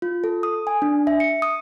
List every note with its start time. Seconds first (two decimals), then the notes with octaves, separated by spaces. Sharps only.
0.02 F4
0.24 A4
0.43 D#6
0.67 G#5
0.82 D4
1.07 E5
1.20 C#7
1.42 D#6